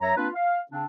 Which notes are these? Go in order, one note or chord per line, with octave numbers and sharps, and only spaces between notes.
F#2 F#3 C#5 E5 A#5
A#3 C4 D4 F4 B4
F5
C#3 C4 D4